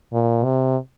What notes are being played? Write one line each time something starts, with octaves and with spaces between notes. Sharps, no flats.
A#2
C3